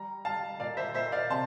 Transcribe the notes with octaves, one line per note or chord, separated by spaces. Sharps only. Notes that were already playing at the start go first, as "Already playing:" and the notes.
Already playing: G3 A#5
G3 F5 A5
A#2 D5 F5
C5 E5
A#2 C5 E5
D5 F5
C3 A5 C6